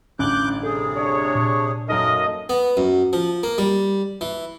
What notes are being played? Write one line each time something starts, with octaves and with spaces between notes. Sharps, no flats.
A1 G2 D3 C#4 D6 F#6 G6
C3 G#4 A4
D4 C#5
A#2
F#2 F#3 A#3 D#4 A4 A#4 D#5
B3
F#2
F3
A#3
G3
E3